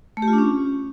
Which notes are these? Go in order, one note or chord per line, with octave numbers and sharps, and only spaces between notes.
A3
G4
F4
D4
C#4